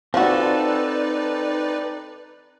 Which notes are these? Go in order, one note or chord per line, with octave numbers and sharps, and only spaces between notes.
F3 C4 D#4 F#4 A4 B4 D5